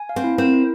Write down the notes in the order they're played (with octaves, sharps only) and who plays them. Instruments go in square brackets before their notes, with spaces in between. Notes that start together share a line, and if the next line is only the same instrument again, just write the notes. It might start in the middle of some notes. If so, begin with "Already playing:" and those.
Already playing: [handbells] G#5
F5
[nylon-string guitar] C4
[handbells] E4
[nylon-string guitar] C4 [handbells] A#4
[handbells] E4